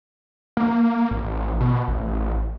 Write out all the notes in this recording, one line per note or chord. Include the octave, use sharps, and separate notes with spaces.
A#3
A1
B2
A1